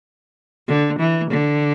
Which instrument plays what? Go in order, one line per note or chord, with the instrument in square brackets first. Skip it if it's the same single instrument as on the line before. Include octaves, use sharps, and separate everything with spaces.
[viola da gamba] D3
E3
D3